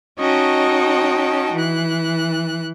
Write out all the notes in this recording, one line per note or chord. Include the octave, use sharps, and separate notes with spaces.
C#4 D#4 F#4 D#5 G5 A5
E3 F#6